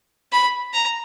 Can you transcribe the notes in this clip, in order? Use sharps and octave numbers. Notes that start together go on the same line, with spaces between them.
B5
A#5